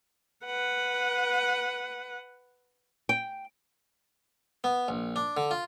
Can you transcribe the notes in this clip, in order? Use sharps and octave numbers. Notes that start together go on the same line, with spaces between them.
B4 F#5
G5
B3
A#1
D4
D3
F4